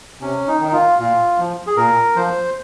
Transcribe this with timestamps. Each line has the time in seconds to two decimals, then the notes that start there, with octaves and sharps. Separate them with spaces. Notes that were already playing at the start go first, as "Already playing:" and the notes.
0.21 C3 C#4
0.47 D#4
0.60 D#3
0.68 D#4
0.73 F4
0.99 A#2 F4
1.39 F3
1.67 G#4
1.77 A#2 A#4
2.16 F3 C5